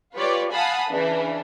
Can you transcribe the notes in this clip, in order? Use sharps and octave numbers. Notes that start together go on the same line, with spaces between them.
F4 G4 B4 C#5 D5
F5 F#5 G#5 A5 B5 D#6
C#3 E3 D4